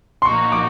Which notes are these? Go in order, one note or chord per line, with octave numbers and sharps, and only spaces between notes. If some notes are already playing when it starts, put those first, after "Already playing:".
C6
A#2 F3 A#3 D#4 F#4 C#6
D6